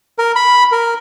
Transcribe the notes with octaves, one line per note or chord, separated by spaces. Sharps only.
A#4
B5
A#4